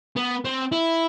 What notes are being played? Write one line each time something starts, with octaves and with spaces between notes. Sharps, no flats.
B3
C4
E4